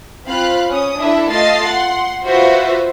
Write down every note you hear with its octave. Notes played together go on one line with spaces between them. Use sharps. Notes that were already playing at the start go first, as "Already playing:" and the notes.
C4 F4 F5 B5 F#6
C#4 D#6
D4 E4 A4 E5
A3 F4 D#5 A5 A6 C7
F#5 C6
F4 F#4 B4 C5 E5